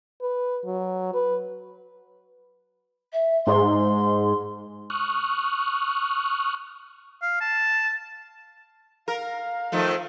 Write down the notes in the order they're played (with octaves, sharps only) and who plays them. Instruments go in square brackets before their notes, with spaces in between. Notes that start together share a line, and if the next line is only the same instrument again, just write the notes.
[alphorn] B4
F#3
B4
[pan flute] E5
[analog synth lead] G#2 [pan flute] C6
[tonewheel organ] C#6 D#6 F6 F#6
[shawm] F5
A5
[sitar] A#4 [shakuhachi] F5
[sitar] D#3 F3 A3